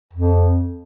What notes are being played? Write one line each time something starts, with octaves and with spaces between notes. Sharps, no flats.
F2